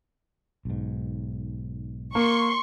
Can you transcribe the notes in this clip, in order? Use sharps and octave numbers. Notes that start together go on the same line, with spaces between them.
B1 G#2
A#3 C6 C#6